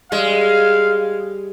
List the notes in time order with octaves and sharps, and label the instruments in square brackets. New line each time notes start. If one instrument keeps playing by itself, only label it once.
[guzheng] G3 [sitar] G#3 [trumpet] F5